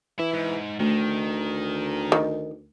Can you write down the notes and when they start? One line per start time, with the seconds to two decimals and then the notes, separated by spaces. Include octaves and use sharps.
0.19 E3 E4
0.34 G#2
0.80 D2 D#3 A3
2.12 D#3